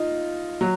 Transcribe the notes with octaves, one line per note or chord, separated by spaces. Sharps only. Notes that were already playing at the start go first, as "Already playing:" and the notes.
Already playing: D#4 F4
F#3